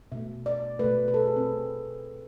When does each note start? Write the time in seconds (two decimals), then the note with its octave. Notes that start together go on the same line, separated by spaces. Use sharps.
0.12 B2 A3 E5
0.46 D5
0.79 B2 A3 B4
1.08 B4
1.14 A4
1.25 G#4
1.36 C4
1.47 B2 A3